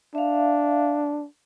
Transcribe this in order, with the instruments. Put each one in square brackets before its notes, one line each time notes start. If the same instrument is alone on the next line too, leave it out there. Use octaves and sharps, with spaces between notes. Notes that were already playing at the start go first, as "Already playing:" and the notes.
[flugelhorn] D4 [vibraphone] E5 F5